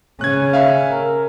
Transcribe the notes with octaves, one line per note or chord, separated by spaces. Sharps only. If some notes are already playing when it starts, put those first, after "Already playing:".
C#3 C#4 F#6 G#6
E5 F5
A#4